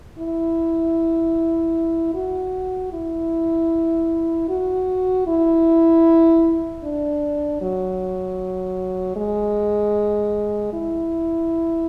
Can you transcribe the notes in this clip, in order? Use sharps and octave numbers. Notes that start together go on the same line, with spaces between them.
E4
F#4
E4
F#4
E4
D4
F#3
G#3
E4